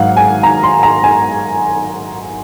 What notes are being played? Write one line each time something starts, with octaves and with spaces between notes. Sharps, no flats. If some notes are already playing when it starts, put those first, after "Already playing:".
Already playing: G#1 G#2 F#3 F5 F#5
G#5
A#5
C6
A#5
G#5